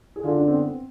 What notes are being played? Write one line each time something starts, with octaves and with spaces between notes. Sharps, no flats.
G#4
D3 F4
D4
C4
B3
C4